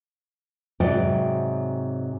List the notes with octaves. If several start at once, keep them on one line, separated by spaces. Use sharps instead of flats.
G#2 C3 F#3 F#4 D5 G5